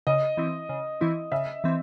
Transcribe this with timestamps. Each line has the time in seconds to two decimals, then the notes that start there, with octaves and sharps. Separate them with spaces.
0.07 C#3 D#5
0.37 E3 C4 E4
0.69 C#3
1.01 E3 C4 E4
1.32 C#3 E5
1.64 E3 C4